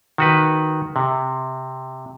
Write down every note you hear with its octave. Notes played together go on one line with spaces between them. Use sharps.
D#3 F#4 B4
C3